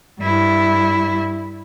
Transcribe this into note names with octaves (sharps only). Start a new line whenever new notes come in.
G2 E4